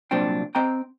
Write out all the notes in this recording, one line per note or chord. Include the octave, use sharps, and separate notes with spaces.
C2 A#2 F#3 C4 D4 G5
C4 D#5 G5 A#5